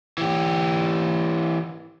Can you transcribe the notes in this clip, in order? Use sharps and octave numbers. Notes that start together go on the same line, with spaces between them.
E3 G4